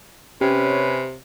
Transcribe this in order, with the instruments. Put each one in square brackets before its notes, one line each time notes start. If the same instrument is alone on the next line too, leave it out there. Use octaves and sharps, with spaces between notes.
[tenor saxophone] C3 [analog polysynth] C#4 [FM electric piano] G4 [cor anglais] B4